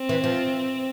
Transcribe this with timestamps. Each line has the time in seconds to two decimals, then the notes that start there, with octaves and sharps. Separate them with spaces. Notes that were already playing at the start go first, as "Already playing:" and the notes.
Already playing: C4
0.09 E3
0.24 F3